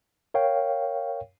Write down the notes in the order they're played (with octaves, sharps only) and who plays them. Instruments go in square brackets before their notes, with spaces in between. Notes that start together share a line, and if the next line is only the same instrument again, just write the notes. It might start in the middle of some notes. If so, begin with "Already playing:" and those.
[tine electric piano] A#4 C#5 F5 G5